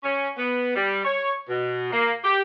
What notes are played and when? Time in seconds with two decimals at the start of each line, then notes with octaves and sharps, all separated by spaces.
0.03 C#4
0.37 B3
0.76 G3
1.05 C#5
1.49 B2
1.92 A#3
2.23 G4